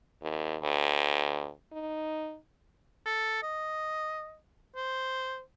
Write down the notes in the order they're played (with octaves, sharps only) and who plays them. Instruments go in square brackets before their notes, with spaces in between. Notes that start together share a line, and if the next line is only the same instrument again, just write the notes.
[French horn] D#2
D2
D#4
[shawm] A4
D#5
C5